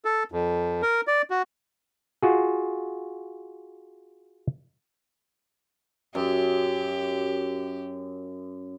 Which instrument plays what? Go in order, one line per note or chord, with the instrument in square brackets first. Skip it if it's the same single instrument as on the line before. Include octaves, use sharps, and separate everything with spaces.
[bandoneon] A4
F2
A#4
D5
F#4
[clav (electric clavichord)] F4 F#4 G#4
[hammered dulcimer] F#2 [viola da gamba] G4